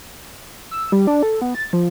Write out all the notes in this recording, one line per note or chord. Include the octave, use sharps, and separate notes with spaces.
E6
G3
D4
A4
B3
A6
F3